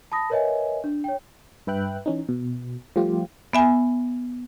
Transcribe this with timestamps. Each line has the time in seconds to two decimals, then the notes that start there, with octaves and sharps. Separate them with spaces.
0.12 A5 B5 D#6 A#6
0.30 A#4 B4 C#5 D#5 E5 G#5
0.84 D4
1.04 C#5 G5
1.67 G2 B4 E5 G5 F#6
2.06 E3 C#4 D#4
2.29 B2
2.96 F3 G3 A3 F4 G4
3.53 B3 E5 G#5